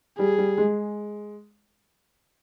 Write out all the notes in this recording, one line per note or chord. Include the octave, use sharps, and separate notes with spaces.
G3 G#4
G3
G#3